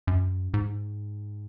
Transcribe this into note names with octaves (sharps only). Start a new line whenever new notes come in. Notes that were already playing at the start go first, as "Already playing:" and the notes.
F#2
G#2